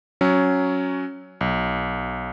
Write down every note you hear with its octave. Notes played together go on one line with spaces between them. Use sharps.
F#3 C#4
B1